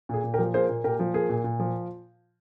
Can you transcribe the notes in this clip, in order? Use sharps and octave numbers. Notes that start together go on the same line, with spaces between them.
A#2 G#4
A#2
G4 A#4
F3
A#3 G#4 C5
A#2
A#2 G4 A#4
F3
A#3 G#4
A#2
A#2
F3